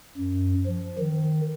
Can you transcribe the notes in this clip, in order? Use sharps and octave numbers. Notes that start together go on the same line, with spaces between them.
F#2
F3
D#3